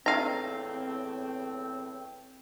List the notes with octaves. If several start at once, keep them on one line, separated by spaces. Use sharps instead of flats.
E2 A2 C4 F5 A#5